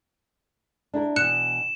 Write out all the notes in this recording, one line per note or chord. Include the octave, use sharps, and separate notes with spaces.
D4 E4 A#4
B2 E3 F#6 C#7 E7